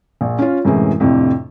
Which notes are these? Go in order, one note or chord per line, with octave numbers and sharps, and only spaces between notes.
A#1
C#4 F4
F#2 A2 C3 E3 G#3
F2 A2 C3 D4